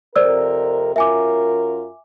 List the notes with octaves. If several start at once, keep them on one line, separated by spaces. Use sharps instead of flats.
F2 C3 A#4 C5 D5 E6
F#2 F4 A#4 E5 G#5 D6